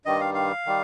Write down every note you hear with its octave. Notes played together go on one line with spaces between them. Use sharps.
G2 D#3 G3 D#5
F5
F5
D#3 G3